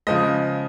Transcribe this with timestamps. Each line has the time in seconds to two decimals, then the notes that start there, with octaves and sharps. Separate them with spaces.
0.07 C#3 F3 G#3 D#5